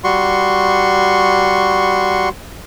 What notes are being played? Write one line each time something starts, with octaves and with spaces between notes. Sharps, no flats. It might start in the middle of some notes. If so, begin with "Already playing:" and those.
G3 F#4 C6 C#6